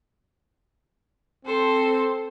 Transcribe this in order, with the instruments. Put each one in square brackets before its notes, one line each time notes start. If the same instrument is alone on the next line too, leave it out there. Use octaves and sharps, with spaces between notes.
[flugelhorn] C4 [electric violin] A4 C5